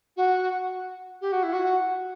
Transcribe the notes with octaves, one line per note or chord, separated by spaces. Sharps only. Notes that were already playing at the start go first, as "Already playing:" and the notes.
F#4
G4
F#4
E4
F#4